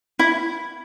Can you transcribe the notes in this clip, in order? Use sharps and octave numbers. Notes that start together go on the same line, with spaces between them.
E4